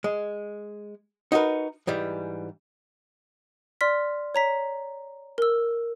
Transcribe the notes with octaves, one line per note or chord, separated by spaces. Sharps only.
G#3
D#4 F#4 G4 A#4 B4
G#2 E3 G3
D5 C6 F6 B6
C#5 A#5 B6
A#4 E6